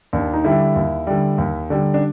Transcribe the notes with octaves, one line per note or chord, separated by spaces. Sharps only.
D#2 D4
D#4
D3 G3 E4
D#2
D3 G3
D#2
D3 G3
D4